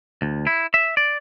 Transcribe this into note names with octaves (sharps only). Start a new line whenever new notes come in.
D2
E4
E5
D5